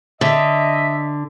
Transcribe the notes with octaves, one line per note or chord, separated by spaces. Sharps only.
D3 D#5 E5